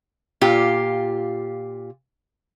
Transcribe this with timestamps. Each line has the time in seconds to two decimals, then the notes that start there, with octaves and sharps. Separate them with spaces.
0.41 A#2 F4 G4